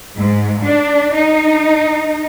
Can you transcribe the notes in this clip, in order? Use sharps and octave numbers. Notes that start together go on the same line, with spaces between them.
G#2
D4
D#4